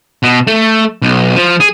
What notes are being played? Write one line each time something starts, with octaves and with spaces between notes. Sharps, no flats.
B2
A3
B1
F3
G#4